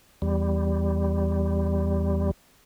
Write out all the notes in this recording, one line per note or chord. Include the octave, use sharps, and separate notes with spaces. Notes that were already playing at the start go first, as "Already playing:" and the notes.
E2 G3